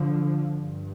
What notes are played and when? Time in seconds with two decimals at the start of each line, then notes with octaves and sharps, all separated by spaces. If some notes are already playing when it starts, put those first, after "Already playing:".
Already playing: D3 F3
0.58 G2